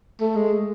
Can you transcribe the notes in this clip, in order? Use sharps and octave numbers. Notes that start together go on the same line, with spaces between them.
A3
G#3